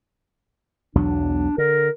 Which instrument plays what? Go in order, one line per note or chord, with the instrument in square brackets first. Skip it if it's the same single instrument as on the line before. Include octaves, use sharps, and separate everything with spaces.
[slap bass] B1 E2 F#3 [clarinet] D4
[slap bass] D3 [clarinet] A#4